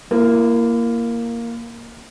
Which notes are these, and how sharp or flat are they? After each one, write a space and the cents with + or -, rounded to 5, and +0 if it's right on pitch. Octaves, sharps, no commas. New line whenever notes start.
A#3 +0 E4 +35